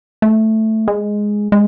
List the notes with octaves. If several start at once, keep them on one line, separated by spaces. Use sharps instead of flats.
A3
G#3
G#3